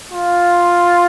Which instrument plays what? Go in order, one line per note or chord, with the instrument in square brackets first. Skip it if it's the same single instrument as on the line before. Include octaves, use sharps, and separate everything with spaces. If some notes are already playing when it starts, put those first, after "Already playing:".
[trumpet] F4